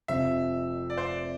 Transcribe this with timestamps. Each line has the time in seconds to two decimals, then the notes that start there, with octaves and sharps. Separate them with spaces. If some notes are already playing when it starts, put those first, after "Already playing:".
0.08 F1 F2 C3 F3 C4 E5
0.90 D5
0.97 C5
1.06 D5